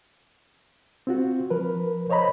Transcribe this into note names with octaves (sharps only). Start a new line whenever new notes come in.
C4 F4 F#4
F3 A#4 B4
C5 C#5 D#5 A#5 B5